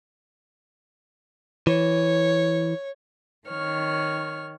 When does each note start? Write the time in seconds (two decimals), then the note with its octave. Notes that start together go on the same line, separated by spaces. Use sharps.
1.67 E3 C#5
3.48 D#3 C#5 F6